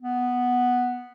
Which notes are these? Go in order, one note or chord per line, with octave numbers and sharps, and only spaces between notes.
B3